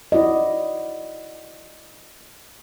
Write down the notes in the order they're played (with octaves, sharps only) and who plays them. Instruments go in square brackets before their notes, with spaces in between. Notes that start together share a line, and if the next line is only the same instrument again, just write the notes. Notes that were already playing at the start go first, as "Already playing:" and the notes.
[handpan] E4 F#4 D5 D#5